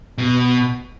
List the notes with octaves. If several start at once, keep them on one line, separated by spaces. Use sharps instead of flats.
B2